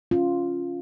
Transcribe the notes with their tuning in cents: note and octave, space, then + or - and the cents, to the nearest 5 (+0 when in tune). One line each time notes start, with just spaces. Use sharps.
C#4 +0 F4 +0